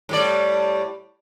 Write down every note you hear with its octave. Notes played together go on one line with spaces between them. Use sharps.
A2 G3 D5